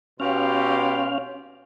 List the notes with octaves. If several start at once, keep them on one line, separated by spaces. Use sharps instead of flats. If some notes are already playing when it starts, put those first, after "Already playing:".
B2 C#4 G4 F5 C6